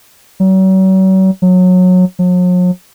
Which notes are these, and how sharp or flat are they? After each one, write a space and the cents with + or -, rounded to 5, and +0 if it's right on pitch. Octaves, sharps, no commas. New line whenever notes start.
F#3 +40
F#3 -20
F#3 -45